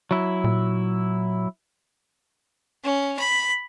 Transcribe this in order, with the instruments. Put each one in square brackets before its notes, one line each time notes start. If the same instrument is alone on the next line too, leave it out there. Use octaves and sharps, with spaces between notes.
[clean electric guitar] F#3 E4
[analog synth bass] A#2
[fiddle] C#4
B5